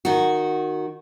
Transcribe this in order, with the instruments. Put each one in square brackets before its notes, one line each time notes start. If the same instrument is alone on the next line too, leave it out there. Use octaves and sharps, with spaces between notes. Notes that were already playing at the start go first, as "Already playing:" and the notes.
[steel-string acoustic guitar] D#3 F#4